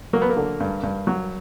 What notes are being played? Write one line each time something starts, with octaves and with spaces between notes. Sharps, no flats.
F#3 A#3
B3
A#3
D3
G2
G2
F#3